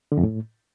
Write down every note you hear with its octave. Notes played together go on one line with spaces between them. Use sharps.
D3
F2
A2